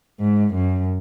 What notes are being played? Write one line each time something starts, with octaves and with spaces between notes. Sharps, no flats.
G#2
F#2